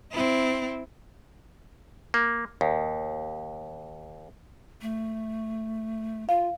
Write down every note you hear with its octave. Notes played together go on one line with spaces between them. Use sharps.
C4 E4
A#3
D#2
A3
F4 F5